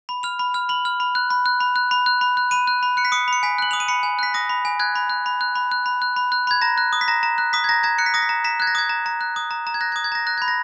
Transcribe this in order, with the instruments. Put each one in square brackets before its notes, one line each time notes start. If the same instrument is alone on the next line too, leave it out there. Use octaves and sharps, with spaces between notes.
[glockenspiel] B5
F6 F7
B5
F6
B5 F#7
F6
B5
F#6
B5
F#6
B5
F#6
B5
F#6
B5
F#6
B5 D#7
F#6
B5
F#6 C#7
B6
D#6 C#7
B5 C#7
G#5 B6
F#6 F#7
D#6 F7
D#7
B5 C#7
G#5
F#6 B6
D#6 A#6
B5
G#5
F#6 G#6
B5
F#6
B5
F#6
B5
F#6
B5
F#6
B5
F#6
B5 G#6
A#5 A#6
F#6
D#6
B6
A#5 A#6
A#5
F#6
D#6 B6
G#6
A#5 A#6
A#5 G#6
F#6 C#7
B6
D#6 A#6
B6
A#5
A#5 B6
F#6 G#6
A#6
D#6 G#6
A#5
A#5
F#6
D#6
A#5
A#5
G#6
F#6 A#6
G#6
D#6
G#6
A#5 A#6
F#6 A#6
B5 G#6
A#6